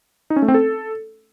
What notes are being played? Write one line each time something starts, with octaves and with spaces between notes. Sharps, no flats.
D#4
C#4
A3
C4
A4